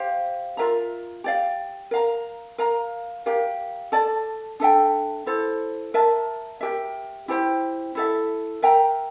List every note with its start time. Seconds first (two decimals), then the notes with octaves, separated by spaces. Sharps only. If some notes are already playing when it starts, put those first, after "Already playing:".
Already playing: G4 C5 F5
0.57 F4 A#4 E5 A#5
1.24 G4 D5 F5
1.91 A#4 F5 A#5
2.58 A#4 F5 A#5
3.26 G4 A#4 F5
3.92 A4 D5 A5
4.60 D4 A4 E5 G5
5.26 E4 A4 C5
5.94 A#4 E5 A5
6.61 G4 A#4 E5
7.28 E4 G4 C5 G5
7.95 E4 A4 E5
8.62 A#4 E5 G5 A#5